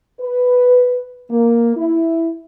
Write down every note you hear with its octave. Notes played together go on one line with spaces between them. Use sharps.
B4
A#3
E4